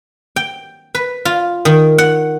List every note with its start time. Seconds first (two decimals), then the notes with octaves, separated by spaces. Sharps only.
0.36 G5
0.95 B4
1.25 F4
1.65 D#3
1.98 F#5